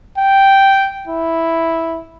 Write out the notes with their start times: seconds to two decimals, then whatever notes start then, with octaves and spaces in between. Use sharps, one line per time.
0.18 G5
1.08 E4